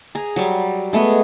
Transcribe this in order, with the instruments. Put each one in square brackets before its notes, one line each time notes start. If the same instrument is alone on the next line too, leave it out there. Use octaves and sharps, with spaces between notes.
[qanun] G#4 A#5
F#3 G3
G#3 A3 B3 G#4